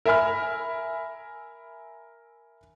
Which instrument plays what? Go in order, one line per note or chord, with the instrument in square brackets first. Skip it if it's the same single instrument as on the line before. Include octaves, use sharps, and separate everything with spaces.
[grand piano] A#4 E5 G#5 B5 F6